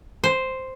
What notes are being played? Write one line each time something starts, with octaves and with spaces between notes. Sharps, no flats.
C5